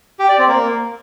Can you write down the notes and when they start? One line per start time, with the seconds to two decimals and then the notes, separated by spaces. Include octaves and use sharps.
0.19 G4
0.29 D5
0.38 C4
0.48 A#3